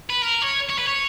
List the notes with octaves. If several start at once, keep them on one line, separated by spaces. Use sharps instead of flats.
B4
A#4
C#5
C#5
B4
C#5